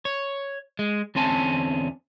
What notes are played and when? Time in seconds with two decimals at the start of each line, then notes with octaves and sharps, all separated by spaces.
0.05 C#5
0.79 G#3
1.15 E2 D3 C4 C#4 G#5 A5